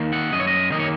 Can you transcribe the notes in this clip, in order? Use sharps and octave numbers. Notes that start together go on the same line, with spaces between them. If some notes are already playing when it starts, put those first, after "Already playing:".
Already playing: D#3 A#3
F#5
F#2 D#5
C#5
D#5
D#3 A#3 C#5 D#5